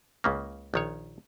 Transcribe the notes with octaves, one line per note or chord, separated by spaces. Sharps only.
C#2 C#3 A#3
A#1 D#3 C#5